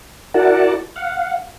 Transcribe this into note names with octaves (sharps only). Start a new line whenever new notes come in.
E4 F#4 A#4 D5 F#5 A5
F5 F#5